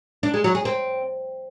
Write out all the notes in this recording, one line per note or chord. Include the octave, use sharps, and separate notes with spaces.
D4
G#3
F#3
G#4
C4